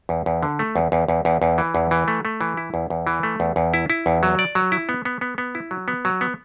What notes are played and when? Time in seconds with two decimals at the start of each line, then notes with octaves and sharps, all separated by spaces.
0.09 E2
0.26 E2
0.43 D3
0.59 A3
0.76 E2
0.92 E2
1.08 E2
1.25 E2
1.42 E2
1.58 E3
1.75 E2
1.91 E3
2.08 A3
2.25 A3
2.41 E3
2.57 E4
2.74 E2
2.90 E2
3.07 E3
3.23 A3
3.40 E2
3.56 E2
3.74 E4
3.90 E4
4.06 E2
4.23 F#3
4.39 D5
4.55 F#3
4.72 E4
4.89 B3
5.05 B3
5.21 B3
5.38 B3
5.55 E4
5.71 F#3
5.88 B3
6.05 F#3
6.21 B3